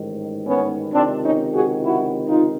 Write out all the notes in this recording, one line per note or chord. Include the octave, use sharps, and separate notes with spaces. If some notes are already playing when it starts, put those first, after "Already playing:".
Already playing: A1 G#2 D#3
B3 C#4
C#2 C3 D#3 C4 D4
C#4 D#4
F#4 G#4
E4 F#4
D#4 F4